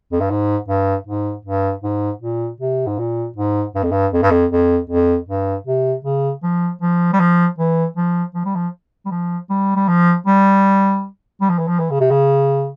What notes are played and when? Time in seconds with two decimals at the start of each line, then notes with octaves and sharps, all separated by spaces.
0.12 F2
0.21 G2
0.30 G#2
0.69 G2
1.07 G#2
1.45 G2
1.84 G#2
2.22 A#2
2.61 C3
2.87 G#2
2.99 A#2
3.37 G#2
3.75 G2
3.84 F2
3.92 G2
4.13 F2
4.23 G2
4.31 F2
4.52 F2
4.90 F2
5.29 G2
5.67 C3
6.05 C#3
6.43 F3
6.82 F3
7.13 G3
7.20 F3
7.59 E3
7.97 F3
8.35 F3
8.45 G3
8.55 F3
9.06 G3
9.11 F3
9.50 G3
9.76 G3
9.88 F3
10.26 G3
11.41 G3
11.50 F3
11.59 E3
11.68 F3
11.79 E3
11.90 C#3
12.01 C3
12.11 C#3